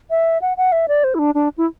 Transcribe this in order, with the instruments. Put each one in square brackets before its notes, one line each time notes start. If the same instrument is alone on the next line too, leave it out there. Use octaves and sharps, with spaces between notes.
[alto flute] E5
F#5
F#5
E5
D5
C5
E4
D4
D4
E4